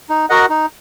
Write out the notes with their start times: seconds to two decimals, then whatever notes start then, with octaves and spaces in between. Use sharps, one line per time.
0.10 D#4
0.30 F#4 A#4 D#5 F#5
0.50 D#4